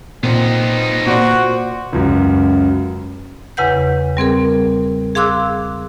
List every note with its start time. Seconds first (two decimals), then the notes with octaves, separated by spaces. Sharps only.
0.23 A#2 B3 C4 D#4
1.07 A#2 F#4 C5 D5
1.93 C#2 F#2
3.57 E2 C#3 B4 F#5 G6
4.17 G3 C4 G#4 A#4
5.15 G#4 F5 C6 D6 E6 F#6